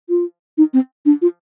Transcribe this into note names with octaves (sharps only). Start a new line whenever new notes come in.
F4
D#4
C4
D4
F4